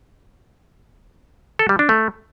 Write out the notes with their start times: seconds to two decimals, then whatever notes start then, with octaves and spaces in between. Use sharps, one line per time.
1.59 A4
1.69 G3
1.79 D4
1.89 A3